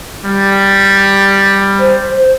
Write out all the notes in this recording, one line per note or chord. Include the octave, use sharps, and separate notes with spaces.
G3
C5